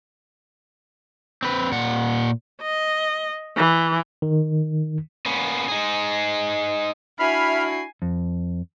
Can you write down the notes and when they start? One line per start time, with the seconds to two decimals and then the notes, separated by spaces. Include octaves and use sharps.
1.42 C4 B4
1.72 A#2 F#5
2.62 D#5
3.57 E3
4.22 D#3
5.26 A#3 B3 C#4
5.68 D#4 G#4
7.19 D4 E4 F#4 E5 G#5 B5 F6 C7
8.02 F2